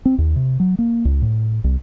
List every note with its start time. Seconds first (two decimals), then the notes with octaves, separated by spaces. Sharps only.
0.05 C4
0.18 D#2
0.36 C3
0.60 F#3
0.79 A#3
1.05 C#2
1.22 A2
1.64 C2